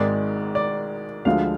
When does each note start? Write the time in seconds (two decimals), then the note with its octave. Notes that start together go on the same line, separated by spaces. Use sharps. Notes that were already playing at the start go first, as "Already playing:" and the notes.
Already playing: G#1 G#2 D#3 G#3 D5
0.55 D5
1.25 D2 D3 F3 G#3 F5